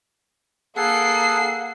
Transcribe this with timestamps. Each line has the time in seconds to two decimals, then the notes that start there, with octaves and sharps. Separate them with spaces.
0.76 A#3 G#4 A4 F#5 C7